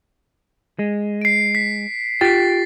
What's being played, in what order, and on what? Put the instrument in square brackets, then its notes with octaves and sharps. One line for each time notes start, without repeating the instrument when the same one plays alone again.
[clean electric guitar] G#3
[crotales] C7 D7
B6
[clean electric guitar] F4 G4 G5 [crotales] A6 B6